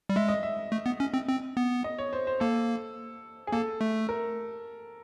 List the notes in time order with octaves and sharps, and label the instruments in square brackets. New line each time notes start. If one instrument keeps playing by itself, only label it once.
[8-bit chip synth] G3
[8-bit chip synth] G#3 [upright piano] E5
[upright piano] D#5
E5
[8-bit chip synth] A3
B3
C#4
C4
C4
B3
[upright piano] D#5
C#5
C5
C5
[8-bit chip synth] A#3 [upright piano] A4
[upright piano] G#4
[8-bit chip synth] A#3 [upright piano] A4
[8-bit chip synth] A3
[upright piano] A#4